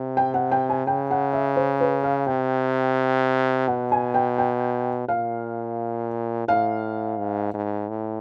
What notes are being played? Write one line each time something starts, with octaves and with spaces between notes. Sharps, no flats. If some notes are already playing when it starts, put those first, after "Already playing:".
Already playing: C3
G5
F#5
G5
G#5
C#3 G5
F#5
E5
C5
B4
F5
C3 G5
B2 F#5
G#5
G5
G5
A#2 F5
A2 F5
G#2
G#2
A2